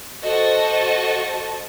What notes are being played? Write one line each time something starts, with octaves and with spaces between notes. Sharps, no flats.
F#4 A4 C5 D#5 A5 C#6